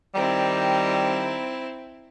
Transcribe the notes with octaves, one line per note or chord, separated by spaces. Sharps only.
D#3 G3 C4 E4 A#5